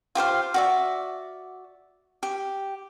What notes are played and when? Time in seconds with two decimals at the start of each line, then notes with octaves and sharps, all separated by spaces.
0.15 F4 G4 C5 F5
0.54 F#4 D5 E5
2.23 G4